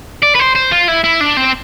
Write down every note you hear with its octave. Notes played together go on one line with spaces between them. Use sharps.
D5
B4
C5
C5
F4
E4
E4
D4
C4